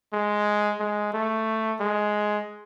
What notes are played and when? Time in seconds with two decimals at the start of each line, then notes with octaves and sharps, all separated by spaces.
0.13 G#3
0.80 G#3
1.14 A3
1.80 G#3